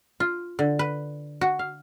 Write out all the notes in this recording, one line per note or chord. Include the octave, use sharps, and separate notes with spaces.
F4
D3
B4
F#4
F5